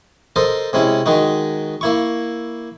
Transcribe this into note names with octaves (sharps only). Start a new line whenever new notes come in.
A4 A#4 C5 D#5
C3 G#3 C#4 E4
D#3 G#3 D#4 F#4
A#3 E4 C#6